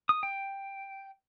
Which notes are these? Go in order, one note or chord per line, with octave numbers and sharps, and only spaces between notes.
D#6
G5